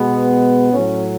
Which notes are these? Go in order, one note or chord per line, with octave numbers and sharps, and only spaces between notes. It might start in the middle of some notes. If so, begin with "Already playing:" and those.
Already playing: B2 G#3 B3
A2 F#3 C#4